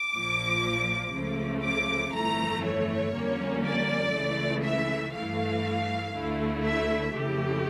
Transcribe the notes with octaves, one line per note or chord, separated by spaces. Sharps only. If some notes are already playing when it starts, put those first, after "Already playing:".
Already playing: D6
A#1 A#2 F3
C#2 C#3 F3 A3
D6
G1 F2 E3 A3 A#5
C#5
F2 D3 G3 A#3 C#4
D5
C#2 C#3 E3 A3
E5
G2 E3 A3 F5
D2 D3 A3 E4
E5
F2 C#3 E3 A3 G4